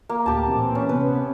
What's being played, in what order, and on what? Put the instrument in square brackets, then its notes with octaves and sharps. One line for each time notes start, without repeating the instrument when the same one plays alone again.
[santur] A#3
[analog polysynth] D2 A2 [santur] G4 A5
[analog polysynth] A#2 E3 C4
[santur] C#4
[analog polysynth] C3 B3 C#4 [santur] B4